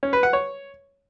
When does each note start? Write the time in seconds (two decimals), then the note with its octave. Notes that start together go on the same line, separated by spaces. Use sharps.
0.03 C#4
0.13 B4
0.23 F#5
0.33 C#5